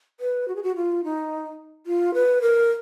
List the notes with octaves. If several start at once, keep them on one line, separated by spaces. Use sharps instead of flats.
B4
F#4
G#4
F#4
F4
D#4
F4
B4
A#4